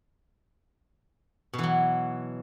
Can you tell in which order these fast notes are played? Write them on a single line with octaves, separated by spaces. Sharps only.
B2 E3 F#3